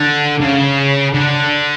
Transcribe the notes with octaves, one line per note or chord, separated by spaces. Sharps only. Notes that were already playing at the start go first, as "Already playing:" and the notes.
Already playing: D3
C#3
D3